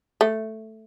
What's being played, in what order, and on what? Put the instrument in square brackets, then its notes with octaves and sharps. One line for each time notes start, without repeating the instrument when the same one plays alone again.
[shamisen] A3